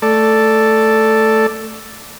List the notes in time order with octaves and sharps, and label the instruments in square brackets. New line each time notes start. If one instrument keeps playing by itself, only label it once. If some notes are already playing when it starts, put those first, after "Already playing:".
[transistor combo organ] A3 A4 D5